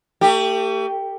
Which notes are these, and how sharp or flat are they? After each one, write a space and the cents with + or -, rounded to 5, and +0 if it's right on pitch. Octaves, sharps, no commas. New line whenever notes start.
A3 +40 G4 +0